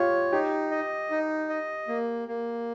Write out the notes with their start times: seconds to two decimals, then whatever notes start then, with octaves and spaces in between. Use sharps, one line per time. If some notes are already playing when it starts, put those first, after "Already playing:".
Already playing: F4 G4 C#5
0.32 D#4 G4
0.71 D#5
1.11 D#4
1.50 D#5
1.88 A#3
2.28 A#3